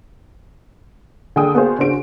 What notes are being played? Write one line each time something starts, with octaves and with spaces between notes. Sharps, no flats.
D3 G#4 G5 D#6
B3 F#4 G#4 C5 F5
C#3 D4 F#4 C5 D7